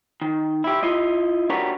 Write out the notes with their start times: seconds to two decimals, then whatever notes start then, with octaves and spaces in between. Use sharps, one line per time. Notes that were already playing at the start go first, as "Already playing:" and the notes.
0.22 D#3
0.64 E4 G4
0.83 E4 F4 D#5
1.50 D4 F#4 G4 A#4 B4 C#5